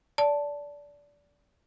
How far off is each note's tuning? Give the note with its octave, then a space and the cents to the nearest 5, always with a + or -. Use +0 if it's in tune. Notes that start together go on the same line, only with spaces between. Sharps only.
D5 -20 A5 +0